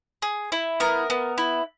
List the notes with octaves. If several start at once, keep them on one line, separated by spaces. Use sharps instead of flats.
G#4
E4
B3 A#4
B3
E4